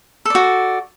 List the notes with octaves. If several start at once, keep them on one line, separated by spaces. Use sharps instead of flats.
F#4 A4 D5